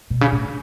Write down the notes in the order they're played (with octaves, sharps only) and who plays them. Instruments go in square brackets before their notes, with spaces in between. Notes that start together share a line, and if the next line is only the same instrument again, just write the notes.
[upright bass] B2
C#3
A2